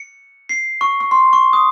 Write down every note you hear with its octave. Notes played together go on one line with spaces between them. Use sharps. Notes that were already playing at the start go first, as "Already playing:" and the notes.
Already playing: C#7
C7
C#6
C#6
C6
C#6
D#6